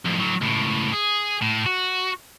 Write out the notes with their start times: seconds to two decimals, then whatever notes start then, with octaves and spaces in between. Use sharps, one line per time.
0.05 F2 A2
0.18 A2 F#3
0.41 C#2 A2
0.93 G#4
1.42 A2
1.66 F#4